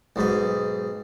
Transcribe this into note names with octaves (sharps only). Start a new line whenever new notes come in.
B1 G#2 D#5